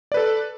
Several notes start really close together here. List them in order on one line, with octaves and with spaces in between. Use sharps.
D5 B4 A4